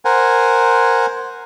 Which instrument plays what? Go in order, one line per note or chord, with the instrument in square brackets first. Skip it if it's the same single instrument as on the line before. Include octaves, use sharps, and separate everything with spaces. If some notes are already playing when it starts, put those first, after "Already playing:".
[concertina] A#4 C5 F#5 G#5